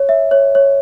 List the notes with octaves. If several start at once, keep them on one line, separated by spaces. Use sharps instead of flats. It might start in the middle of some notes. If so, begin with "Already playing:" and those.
Already playing: C#5
E5
C#5
C#5